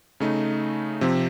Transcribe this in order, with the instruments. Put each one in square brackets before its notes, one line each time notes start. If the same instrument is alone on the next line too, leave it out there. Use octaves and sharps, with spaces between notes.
[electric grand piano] C#3 A3 D#4
C3 F3 C4